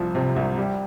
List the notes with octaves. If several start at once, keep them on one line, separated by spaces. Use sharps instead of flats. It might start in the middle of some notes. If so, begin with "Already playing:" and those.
Already playing: C2 F3
C3
C2
G3